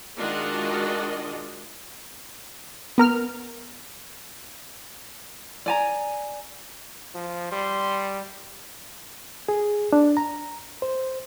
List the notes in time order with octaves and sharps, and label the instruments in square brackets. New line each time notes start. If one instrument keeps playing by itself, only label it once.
[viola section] D#3 G#3 D4 F4 F#4 D#5
[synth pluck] B3 A#4 F6
[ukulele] D5 G#5 A#5
[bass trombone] F3
[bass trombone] G3 [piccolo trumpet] C6
[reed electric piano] G#4
D4
A#5
C5